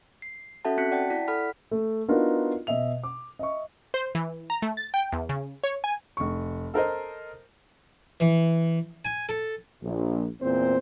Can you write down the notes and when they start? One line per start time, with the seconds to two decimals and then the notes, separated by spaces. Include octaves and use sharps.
0.22 C7
0.65 C#4 F#4 A4 E5 F#5 A5
0.78 C4 F#4 F#6 B6 C#7
0.91 D5 F#5 G5 A5
1.10 E4 D5 B6
1.28 A4 F#5 B5 F6 B6
1.71 A3
2.08 B3 D4 D#4 F4 F#4 A#4
2.67 B2 D#5 E5 F7
3.03 D6
3.39 D#5 E5 C#6
3.94 C5
4.15 E3
4.50 A#5
4.62 A3
4.77 A6
4.94 G5
5.12 E2
5.29 C#3
5.64 C#5
5.84 G#5
6.17 F1 C#6
6.74 A4 A#4 C5 D#5
8.20 E3
9.05 G#5
9.29 A4
9.82 A#1
10.41 E2 A#2 C4 C5